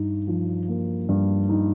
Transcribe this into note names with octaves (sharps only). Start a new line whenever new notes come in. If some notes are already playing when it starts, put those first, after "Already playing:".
Already playing: G2 D#4
F3
A#3
G2
D#4